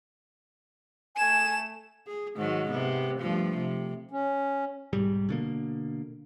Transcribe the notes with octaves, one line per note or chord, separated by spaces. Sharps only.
A3 G#5 E7
G#4
G#2 D#3 F#3
C3 B3
G2 F3 A3
C3
C#4
B1 G#2 G3
B2 D3 A#3